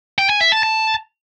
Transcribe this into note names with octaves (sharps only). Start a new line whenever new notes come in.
G5
G#5
E5
A5
A5